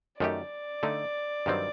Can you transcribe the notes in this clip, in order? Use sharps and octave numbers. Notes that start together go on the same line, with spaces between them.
F#2 D#3 A3 D#4 G4 D5
D3 A3 D#4
G2 D#3 F#3 C4